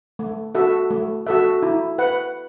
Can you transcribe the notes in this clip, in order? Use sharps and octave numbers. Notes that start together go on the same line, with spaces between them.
A3
F#4 A4 E5
A3
F#4 A4 E5
E4
B4 F#5